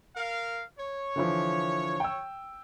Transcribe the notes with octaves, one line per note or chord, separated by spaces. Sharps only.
A#4 F5
C#5
D3 E3 F3
G5 E6